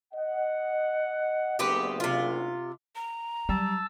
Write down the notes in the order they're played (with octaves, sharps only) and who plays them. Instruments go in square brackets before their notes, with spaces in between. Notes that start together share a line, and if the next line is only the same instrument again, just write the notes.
[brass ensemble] D#5 F#5
[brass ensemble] F#1 D2 [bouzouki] B3 C4 G4
[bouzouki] C3 F4
[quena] A#5
[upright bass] F#3 [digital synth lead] G3 [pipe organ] A5 E6